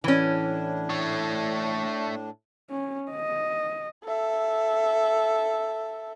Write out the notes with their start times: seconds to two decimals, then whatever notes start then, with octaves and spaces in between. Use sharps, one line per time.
0.04 A2 E3 C#4 D4
0.90 A3 C#5
2.71 C#4
3.11 D#5
4.05 A4 E5